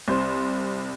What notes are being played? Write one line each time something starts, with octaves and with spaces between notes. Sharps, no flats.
C2 C5